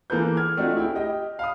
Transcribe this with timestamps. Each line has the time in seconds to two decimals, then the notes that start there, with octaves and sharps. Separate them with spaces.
0.10 E3 A#3 G#4 A4 B4 G6
0.37 F6 G#6
0.57 A3 C4 D4 D#4 F4 F#4
0.77 E4 G#4 G5
0.95 G4 D#5 G5
1.39 F5 B5 D#6